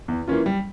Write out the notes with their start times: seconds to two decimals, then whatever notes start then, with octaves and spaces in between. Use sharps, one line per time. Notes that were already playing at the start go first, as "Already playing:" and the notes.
0.08 E2
0.28 E3 A#3 C#4 F4
0.46 G3